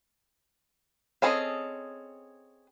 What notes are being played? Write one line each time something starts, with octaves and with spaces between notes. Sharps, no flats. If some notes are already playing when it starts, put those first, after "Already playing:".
C4 C#4 G#4 A4 D#5